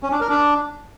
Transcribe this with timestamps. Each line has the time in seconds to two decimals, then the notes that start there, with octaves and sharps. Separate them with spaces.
0.03 C#4
0.12 D4
0.20 A#4
0.29 D4